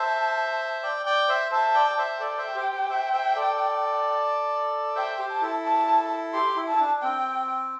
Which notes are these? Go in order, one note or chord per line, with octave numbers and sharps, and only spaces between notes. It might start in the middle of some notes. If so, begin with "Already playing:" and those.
Already playing: C5 E5 A5
D5 G5
D5 G5
C5 E5
C5 E5 A5
D5 G5
C5 E5
A4 D5 G5
C5 E5
G4 C5
G4 C5
C5 E5
C5 E5
A4 D5
C5 E5 G5
G4 C5
A5
E4 A4
A5
G4 C6
E4
A5
E4
D4
C4 G5